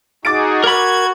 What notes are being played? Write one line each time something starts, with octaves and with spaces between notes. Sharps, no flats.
D#4 F#4 G#4 D6 A6 D7
F#4 A#4 B5 G#6